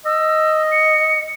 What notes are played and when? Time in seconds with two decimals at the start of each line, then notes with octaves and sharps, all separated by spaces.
0.06 D#5 E6
0.72 C#7